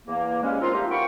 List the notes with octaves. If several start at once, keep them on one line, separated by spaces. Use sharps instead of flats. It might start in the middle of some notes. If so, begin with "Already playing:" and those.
E2 A#3
C#3 F3 G3 G#3 C#4
F3 A#3 C4 D#4 F4
F3 G3 A3 D#4 F4 G4
F#4 A#4 F5 G5 B5 C#6